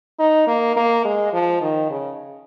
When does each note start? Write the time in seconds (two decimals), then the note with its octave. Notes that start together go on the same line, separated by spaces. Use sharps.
0.19 D#4
0.47 A#3
0.76 A#3
1.05 G#3
1.33 F3
1.61 D#3
1.90 C#3